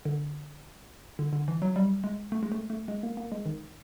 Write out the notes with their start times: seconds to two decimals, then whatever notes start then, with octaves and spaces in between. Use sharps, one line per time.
0.05 D3
1.19 D3
1.33 D3
1.48 E3
1.62 F#3
1.76 G3
2.04 G#3
2.32 A3
2.43 G#3
2.52 A3
2.70 A3
2.88 G#3
3.03 A#3
3.17 A#3
3.32 G#3
3.46 D#3